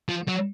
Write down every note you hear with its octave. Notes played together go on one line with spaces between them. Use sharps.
F3
F#3